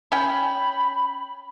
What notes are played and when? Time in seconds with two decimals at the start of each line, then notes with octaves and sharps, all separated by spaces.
0.12 C#4 G5 B5